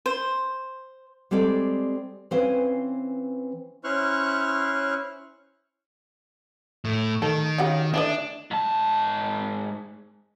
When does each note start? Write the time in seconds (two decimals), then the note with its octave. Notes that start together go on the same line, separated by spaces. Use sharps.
0.06 C5
1.31 G3 G#3 C4 A4 D5
2.31 E3 C4 C#4 C5 F5 G#5
3.84 C#4 E4 C5 C#6 F6 F#6
6.85 A2
7.22 D#3 A4
7.58 C#3 F#4 G4
7.94 E3 A3 D4 D#5
8.51 G#2 A5